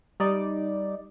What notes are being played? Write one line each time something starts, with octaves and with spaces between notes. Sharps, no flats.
G3 D#4 D5